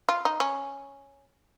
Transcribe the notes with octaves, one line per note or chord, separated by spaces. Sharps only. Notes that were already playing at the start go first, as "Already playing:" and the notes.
F4
D#4
C#4